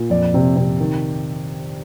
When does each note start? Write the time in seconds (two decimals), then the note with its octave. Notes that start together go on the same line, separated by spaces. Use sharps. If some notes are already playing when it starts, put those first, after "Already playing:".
Already playing: A#2
0.10 F2 D5
0.34 C3
0.56 C3
0.80 D#3